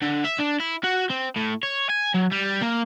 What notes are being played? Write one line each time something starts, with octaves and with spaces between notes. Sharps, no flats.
D3
E5
D4
E4
F#4
C4
A2
C#5
G#5
F#3
G3
A#3